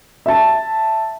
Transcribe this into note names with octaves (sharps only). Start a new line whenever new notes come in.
E5 A5